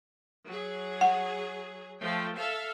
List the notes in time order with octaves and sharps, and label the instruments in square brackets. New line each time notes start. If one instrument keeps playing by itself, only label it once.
[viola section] F#3 G#4
[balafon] F#5
[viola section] F3 A3 G5
A4 E5 F5